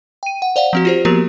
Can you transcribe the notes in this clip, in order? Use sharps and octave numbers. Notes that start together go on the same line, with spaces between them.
G5 D#7
F#5
C5 D5 F5 F#5
F3 C4 F#4
F4 G4 C5
F3 A#3 B3 F#4 G4 A#4